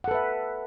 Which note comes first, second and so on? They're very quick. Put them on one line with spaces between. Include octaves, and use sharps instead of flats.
F#5 A4 B4 E5